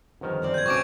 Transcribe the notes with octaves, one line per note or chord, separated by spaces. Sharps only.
G1 F2 D#3 B3 C5 F6
F#2 C4 D5
G6 G#6
B1 C4 C#4 G#5 C#6 D6 D7